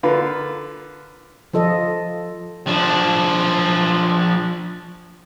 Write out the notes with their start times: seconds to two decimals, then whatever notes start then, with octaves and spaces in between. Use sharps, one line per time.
0.03 D3 F4 A#4 B4
1.54 F3 F4 A4 D#5
2.67 F3 D4